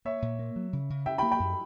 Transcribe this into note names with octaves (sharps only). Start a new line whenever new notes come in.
A#3 C#5 E5
A#2
A#3
F#3
C#3
C#3
C#3 E5 G5
G5 B5
A#3
G5 B5
F#2